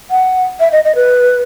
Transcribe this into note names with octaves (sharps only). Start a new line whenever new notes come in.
F#5
E5
D#5
D#5
B4